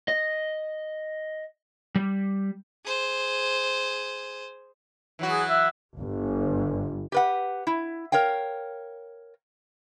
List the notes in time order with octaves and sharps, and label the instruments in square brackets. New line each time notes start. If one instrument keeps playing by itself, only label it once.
[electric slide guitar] D#5
G3
[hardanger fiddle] G#4 C5
[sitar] E3 F#3 F#4
[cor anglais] G#4
E5
[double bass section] G1
[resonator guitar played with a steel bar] G4 B4 F#5
E4
A#4 C#5 F5 G5